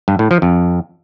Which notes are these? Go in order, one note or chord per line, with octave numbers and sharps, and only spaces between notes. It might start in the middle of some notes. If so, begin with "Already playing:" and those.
G2
A2
F3
F2